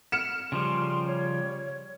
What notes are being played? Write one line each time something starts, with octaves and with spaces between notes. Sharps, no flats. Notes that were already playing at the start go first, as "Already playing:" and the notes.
F6 C#7 E7
C#3 F3 G3 C6
C#5